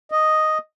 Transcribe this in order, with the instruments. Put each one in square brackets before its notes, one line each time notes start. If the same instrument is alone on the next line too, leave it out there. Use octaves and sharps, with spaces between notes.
[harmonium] D#5